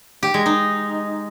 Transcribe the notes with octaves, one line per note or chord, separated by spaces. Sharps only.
G4
G#3
D#4